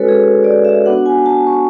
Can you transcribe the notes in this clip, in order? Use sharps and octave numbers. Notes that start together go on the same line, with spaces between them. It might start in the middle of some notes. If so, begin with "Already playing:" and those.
Already playing: G#3 C#4 F#4 A4 B4 C#5
G#4
D5
E5
B3 D4 F#4 F#5
G#5
A5
C#6